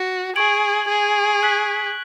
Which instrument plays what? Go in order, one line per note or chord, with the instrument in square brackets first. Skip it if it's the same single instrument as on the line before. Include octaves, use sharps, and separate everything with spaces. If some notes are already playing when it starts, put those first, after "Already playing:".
Already playing: [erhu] F#4
[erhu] G#4 [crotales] C#6 G#6 D7 F#7
[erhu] G#4
[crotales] F#6 B6 F#7